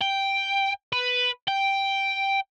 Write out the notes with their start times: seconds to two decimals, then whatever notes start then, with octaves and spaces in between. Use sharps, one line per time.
0.02 G5
0.93 B4
1.48 G5